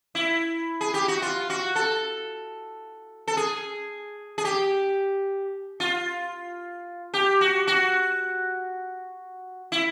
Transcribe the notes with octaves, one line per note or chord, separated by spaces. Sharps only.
E4
G#4
G4
F#4
F4
F#4
A4
A4
G#4
G#4
G4
F4
G4
F#4
F#4
E4